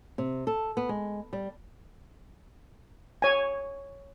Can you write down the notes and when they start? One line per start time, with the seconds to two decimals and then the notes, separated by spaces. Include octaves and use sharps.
0.18 C3
0.47 A4
0.77 B3
0.89 G#3
1.33 G3
3.22 C#5 G#5